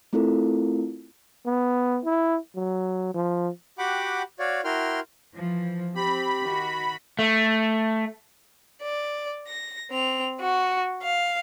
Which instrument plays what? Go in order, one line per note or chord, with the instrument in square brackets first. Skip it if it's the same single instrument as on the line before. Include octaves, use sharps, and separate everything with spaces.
[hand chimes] A3 C4 E4 F4 A4 A#4
[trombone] B3
E4
F#3
F3
[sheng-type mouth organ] F#4 G4 F#5 G5 B5 D6
F#4 C#5 D5 F5
E4 F#4 A#4 G5 C6 F6
[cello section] E3 F3
[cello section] C4 [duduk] G4 [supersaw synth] B5
[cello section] D#3 F#4
[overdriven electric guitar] A3
[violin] D5
A#6
C4 F7
F#4
F5